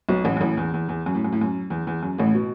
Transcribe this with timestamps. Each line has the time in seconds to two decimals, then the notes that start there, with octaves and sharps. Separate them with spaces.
0.09 B1 B2
0.24 A1 A2
0.37 F#2
0.41 A1 A2
0.57 E2
0.74 E2
0.89 E2
1.06 F#2
1.15 A2
1.24 F#2
1.32 A2
1.41 F#2
1.70 E2
1.87 E2
2.03 F#2
2.18 A1 A2
2.34 B2